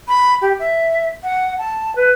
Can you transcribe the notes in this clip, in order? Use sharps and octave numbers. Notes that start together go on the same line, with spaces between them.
B5
G4
E5
F#5
A5
B4